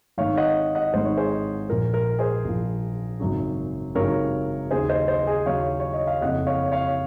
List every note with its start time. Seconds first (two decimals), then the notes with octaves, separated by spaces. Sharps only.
0.18 G#1 G#2 D#3 C#5 F5
0.37 D#5 F#5
0.75 D#5 F#5
0.94 G#1 G#2 D#3 C5
1.05 C#5
1.17 G#4 C5
1.69 A#1 A#2 F3 A#4
1.94 A#4
2.19 G#4 C5
2.45 A#1 A#2 F3
3.20 G#1 F#2 C#3 F#3
3.95 G#1 F#2 C#3 F#3 A#4 C#5
4.70 D#2 C#3 F#3 G#4 C5
4.89 C5 D#5
5.08 C5 D#5
5.27 G#4
5.46 D#2 C#3 F#3 C#5 F5
5.80 C#5
5.94 D#5
6.07 F5
6.21 F#1 F2 C#3 D#5 F#5
6.47 C#5 F5
6.72 C#5 F5